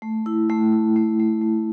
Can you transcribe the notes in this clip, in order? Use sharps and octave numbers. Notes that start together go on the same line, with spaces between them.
A3
E4
A3
E4
A3
A3
A3